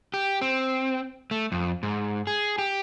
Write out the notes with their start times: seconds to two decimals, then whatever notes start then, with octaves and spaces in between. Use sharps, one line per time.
0.14 G4
0.41 C4
1.31 A3
1.52 F2
1.83 G#2
2.27 G#4
2.58 G4